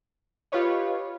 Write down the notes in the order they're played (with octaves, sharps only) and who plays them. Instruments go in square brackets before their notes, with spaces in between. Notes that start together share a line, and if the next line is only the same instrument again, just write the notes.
[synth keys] F4 G4 B4 C#5 D#5